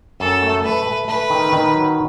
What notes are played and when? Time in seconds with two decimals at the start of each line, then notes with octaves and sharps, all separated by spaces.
0.20 F#2 A4
0.42 A3
0.64 A3 B4
0.86 A3
1.08 A3 B4
1.30 D#3
1.52 D#3
1.74 F#3